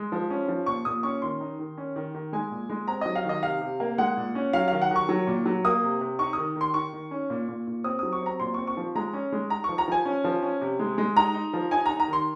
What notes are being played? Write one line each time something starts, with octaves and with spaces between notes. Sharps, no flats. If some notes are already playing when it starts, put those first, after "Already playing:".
Already playing: G#3
F3
C#4
F3
A#2 C#6
A#2 D#6
C#4 C#6
D#3 C6
D#4
D#3
C#4
D#3
D#3
G#3 G#5
A#2
G#3
C4 A#5
F#3 D#5
F5
D#3 D#5
C3 F5
C3
A#3
G#3 F#5
A#2
C#4
F#3 F5
D#3 F5
F#5
D#3 C#6
F#3
A#2
F#3
A#3 D#6
C3
C3
D#4 C#6
D#3 D#6
D#3
C6
D#3 C#6
D#3
C#4
A#2
A#2
A#2
C4 D#6
F#3 D#6
C#6
C4 A#5
A#2 C6
C4 C#6
C#6
F3
G#3 A#5
C#4
G#3
D#4 A#5
F3 C#6
A#5
F3 G#5
C#4
F3
C#4
C3
G#3
G#3
D#4 A#5
D#4
F3
D#4 G#5
D#4 A#5
A#5
D#3 C6